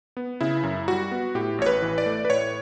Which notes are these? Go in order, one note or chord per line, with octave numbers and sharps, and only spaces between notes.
B3
C#3 E4
F#2
G3 F#4
B3
A2 G4
A1 C#5
B4
E3
D5
A3
B4
A2 C#5